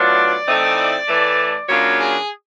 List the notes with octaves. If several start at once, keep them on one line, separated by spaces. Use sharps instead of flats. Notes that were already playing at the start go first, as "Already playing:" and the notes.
Already playing: A2 F#3 B3 D4 F4 D5
A2 E3 A3 C4 D#4
A2 E3 A3
C#3 F#3 A#3 D4 F4 C#5
G#4